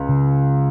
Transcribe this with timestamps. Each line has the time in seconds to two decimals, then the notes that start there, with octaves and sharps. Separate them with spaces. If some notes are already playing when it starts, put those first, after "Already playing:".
Already playing: C#2
0.09 C#3